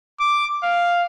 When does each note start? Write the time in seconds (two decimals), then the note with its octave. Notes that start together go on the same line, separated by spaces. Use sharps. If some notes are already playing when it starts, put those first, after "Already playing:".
0.20 D6
0.64 F5